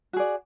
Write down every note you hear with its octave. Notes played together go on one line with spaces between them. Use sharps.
F#4 G#4 D5